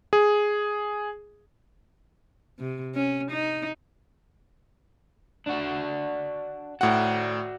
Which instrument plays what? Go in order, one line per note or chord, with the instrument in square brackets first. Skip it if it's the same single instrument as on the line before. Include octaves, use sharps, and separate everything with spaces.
[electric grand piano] G#4
[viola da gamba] C3
C#4
D#4
[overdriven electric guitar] D4 F#4
[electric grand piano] A2 F#5 [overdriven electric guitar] F#4 D5